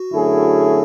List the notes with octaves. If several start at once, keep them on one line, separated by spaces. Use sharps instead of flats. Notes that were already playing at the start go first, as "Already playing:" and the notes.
Already playing: F#4
F#2 D3 A3 E4 G#4